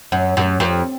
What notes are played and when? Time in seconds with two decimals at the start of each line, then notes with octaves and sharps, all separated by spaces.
0.12 F#2
0.37 F#2
0.60 F2